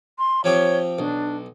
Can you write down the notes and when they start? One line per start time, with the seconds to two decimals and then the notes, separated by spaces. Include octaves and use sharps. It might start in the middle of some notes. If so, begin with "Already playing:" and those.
0.18 C6
0.44 F3 C4 G4 C#5
0.99 B1 D4